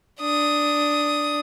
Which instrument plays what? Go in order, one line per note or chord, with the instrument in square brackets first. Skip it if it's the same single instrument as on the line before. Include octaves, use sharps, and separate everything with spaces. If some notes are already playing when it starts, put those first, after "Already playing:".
[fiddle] D4 D#6